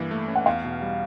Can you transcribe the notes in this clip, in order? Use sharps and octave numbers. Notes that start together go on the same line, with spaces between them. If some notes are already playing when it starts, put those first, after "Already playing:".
Already playing: G2 E3 A#3
A3
C#4
F#5
E2 F5
B2
G3